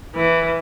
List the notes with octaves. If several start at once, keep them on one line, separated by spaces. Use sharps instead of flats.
E3